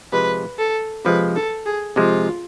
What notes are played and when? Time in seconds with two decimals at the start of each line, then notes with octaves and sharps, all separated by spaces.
0.12 C3 F3 G#3 B4
0.58 A4
1.05 C3 F3 G#3 B4
1.36 A4
1.66 G#4
1.96 C3 F3 G#3 F4